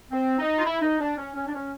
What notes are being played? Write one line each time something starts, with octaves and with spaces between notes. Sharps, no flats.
C4
D#4
F4
E4
D#4
D4
C#4
C#4
D4
C#4